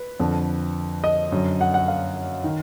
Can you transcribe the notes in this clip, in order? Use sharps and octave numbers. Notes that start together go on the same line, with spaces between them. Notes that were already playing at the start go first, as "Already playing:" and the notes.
Already playing: B4
F2 D3
D#5
F#2 D3
F#5
F#5
F5
D#3